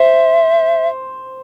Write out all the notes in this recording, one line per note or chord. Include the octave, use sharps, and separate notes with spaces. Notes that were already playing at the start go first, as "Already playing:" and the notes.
Already playing: C5 E5